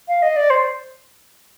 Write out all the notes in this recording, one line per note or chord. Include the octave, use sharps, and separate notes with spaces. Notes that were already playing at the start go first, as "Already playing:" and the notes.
F5
D#5
D5
C5